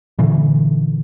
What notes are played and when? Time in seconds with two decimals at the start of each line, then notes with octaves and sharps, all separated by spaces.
0.19 A#2 D3 E3